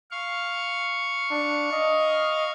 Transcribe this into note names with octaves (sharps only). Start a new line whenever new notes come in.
F5 C#6
D4
D#5